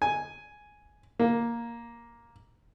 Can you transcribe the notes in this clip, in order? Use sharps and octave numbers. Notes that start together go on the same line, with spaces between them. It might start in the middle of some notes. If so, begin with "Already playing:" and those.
G#5
A#3